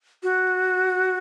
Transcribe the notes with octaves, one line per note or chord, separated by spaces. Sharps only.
F#4